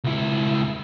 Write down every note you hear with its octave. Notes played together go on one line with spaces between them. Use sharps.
C#2 E4